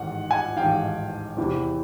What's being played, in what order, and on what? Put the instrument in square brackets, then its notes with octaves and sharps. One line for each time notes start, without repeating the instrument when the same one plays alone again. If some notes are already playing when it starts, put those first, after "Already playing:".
Already playing: [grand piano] A1 G#2 D#3 F#5
F#5 G#5
A1 G#2 D#3 F5 G5
E2 C3 E3